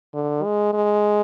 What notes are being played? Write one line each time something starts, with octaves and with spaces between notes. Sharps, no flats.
D3
G#3
G#3